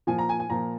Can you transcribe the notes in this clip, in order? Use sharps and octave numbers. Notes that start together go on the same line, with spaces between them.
A#2 F3 G#5
A#5
G#5
G#5
A#2 F3 A#5